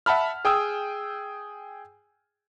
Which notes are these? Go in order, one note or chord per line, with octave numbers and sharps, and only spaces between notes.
E5 F#5 A5 B5 F6
G#4 G5 D#6 E6